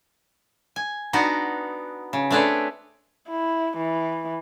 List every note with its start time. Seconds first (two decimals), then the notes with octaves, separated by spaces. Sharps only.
0.76 G#5
1.13 B3 D4 D#4 F#4 F#5
2.13 C#3
2.31 A3 C4 D4 G#4 B4 C#5
3.28 E4
3.77 E3